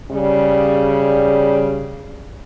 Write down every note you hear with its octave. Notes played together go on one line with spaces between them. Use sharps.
C#3 G3